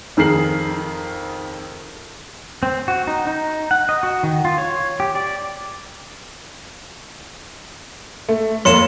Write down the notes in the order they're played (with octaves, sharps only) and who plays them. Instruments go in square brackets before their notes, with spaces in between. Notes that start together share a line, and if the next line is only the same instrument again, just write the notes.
[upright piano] F2 D#3 G#4 A#4 C7 F#7
[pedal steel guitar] C4
F#4
D#4
D#4
F#5
D#5
F#4
D#3
F4
C#5
G4
D5
[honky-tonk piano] A3
[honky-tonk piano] F2 A#3 [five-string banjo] C#5 [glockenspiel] C6 C#7 E7